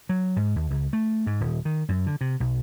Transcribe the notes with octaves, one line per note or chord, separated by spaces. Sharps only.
F#3
G#2
D#2
C#2
A3
G#2
D#1
D#3
F#2
D3
C3
B1